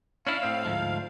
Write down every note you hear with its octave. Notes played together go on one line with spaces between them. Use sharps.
C#4 D4 E4 F5
A2 C4
D2 G#2 F3